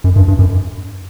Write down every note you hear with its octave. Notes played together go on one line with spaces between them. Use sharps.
F#2
G2
G2
F#2